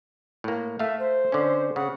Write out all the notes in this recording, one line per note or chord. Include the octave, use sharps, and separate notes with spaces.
A2 A#3
A3 E5 F5
C5
D3 C#4
C#3 F#5